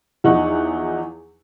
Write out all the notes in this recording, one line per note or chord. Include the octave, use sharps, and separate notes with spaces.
E2 F3 D#4 E4 F#5 C#6